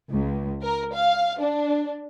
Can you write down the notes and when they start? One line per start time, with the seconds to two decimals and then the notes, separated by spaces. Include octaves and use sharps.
0.11 C#2
0.63 A#4
0.94 F5
1.40 D4